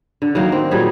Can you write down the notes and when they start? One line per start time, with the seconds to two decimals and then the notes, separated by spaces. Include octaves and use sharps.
0.22 D3
0.35 D#3 F#3 A#3
0.52 C4
0.71 A#2 F#3 G3 G#4